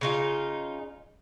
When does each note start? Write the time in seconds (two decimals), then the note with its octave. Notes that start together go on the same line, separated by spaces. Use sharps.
0.01 C#3 D#4 F4